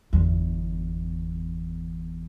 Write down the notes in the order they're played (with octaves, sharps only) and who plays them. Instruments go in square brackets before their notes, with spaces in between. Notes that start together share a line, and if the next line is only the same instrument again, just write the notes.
[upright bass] G1 E2